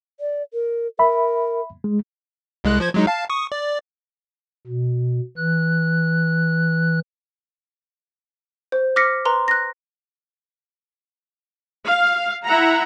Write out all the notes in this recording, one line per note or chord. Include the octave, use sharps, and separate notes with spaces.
D5
A#4
A#4 E5 B5
G#3
C2 G#3 F#6
F3 C5 G#6
F#3 G#3 D#4
F5 A5
C#6 D#6
D5
B2
E3 F#6
C5
D6 F6 A#6 B6 C#7
B4 A#5 C6
F#6 A#6
F5
E4 E5 F#5 A#5